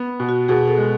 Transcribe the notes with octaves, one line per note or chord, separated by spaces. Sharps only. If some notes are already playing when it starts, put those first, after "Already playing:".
Already playing: B3
B2
F#4
B2 G#4
A4
G#3